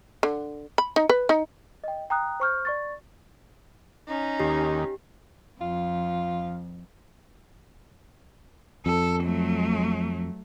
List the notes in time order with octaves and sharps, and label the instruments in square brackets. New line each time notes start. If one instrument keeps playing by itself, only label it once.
[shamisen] D3
B5
D#4
B4
D#4
[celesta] D#5 G5
G5 A#5 D#6 F#6
C5 C#6 F6 G6
D5 C#6 A6
[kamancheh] C#4 D#4
[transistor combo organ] D#2 [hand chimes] G4
[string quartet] F2 [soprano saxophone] F4
[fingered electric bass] F2 [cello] A4
[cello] F#3 A3